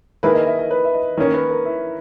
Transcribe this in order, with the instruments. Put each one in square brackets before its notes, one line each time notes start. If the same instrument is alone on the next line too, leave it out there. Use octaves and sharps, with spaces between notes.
[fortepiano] D#3 A#3 E4 G#4 [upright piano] B4
[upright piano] D#5
E5
D#5
B4
E5
D#5
[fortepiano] D#3 A#3 C#4 [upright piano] C#5
[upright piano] B4
A#4
E4